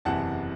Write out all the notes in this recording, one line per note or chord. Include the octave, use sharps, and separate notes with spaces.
F#1 E2 C3 E3 F#5 A5